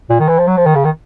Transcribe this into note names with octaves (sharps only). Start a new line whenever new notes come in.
A#2
D#3
E3
F3
F#3
F3
D#3
C#3
D#3